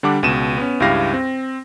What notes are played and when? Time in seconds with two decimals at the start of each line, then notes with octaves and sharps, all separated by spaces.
0.03 D3 G3 D4 F#5 D6
0.23 C#2 B2 D#7 E7
0.57 B3 C#4
0.80 C#2 G2 E4 G4 F5 A#6
1.14 C4